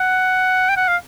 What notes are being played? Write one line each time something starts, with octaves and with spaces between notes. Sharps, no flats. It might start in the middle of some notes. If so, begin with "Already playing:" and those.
Already playing: F#5
G5
F#5
F5